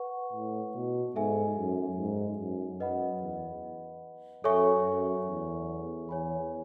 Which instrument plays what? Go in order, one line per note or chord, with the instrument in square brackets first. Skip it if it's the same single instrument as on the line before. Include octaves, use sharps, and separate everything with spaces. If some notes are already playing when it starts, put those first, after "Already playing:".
Already playing: [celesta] B4 F#5 C#6
[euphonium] A2
B2
[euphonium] G#2 [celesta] D#4 A4 E5 G#5
[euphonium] F#2
G#2
F#2
[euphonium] F#2 [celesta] B4 D#5 F#5 B5
[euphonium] E2
[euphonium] F#2 [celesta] A4 C#5 E5 G#5 C#6
[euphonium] F#2
E2
[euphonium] E2 [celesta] C#5 G#5 B5